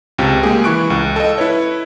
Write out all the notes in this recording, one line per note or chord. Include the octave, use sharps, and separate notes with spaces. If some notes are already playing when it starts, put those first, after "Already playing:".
C#2 C3
G#3 A#3 G4 G#4
E3 E4 C#6 F#6 D7
C#2
A4 D#5
E4 B4 C#5